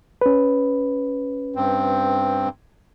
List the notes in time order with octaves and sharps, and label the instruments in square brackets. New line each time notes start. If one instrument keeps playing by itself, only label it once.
[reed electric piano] C#4 B4
[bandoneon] G2 C4